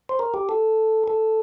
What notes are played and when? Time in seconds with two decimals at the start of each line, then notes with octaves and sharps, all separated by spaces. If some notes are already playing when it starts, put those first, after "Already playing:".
0.09 C5
0.19 A#4
0.34 G4
0.49 A4
1.08 A4